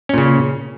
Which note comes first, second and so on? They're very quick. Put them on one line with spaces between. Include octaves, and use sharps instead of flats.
C#4 A#2 C#3